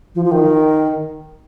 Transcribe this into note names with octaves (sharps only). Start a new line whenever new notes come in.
F3
F3
D#3